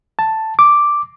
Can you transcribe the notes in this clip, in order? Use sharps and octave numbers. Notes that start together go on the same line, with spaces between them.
A5
D6